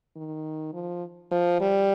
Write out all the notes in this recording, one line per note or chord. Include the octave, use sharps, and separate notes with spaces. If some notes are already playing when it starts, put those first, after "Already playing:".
D#3
F3
F3
G3